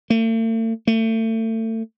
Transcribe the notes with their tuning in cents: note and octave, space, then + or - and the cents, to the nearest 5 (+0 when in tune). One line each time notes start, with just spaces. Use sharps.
A3 +45
A3 +30